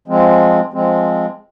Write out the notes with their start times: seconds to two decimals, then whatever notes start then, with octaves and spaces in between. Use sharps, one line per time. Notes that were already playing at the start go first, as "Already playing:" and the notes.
0.08 F3 G#3 C4
0.73 F3 G#3 C4